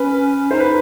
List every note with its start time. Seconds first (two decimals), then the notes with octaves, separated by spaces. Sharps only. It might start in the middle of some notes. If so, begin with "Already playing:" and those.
Already playing: C#4 B4
0.51 D#4 C5
0.60 B4